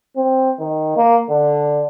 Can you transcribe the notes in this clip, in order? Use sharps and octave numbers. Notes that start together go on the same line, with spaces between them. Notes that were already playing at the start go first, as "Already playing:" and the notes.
C4
D#3
A#3
D3